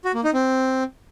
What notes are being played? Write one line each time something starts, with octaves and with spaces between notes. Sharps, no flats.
F#4
A#3
D#4
C4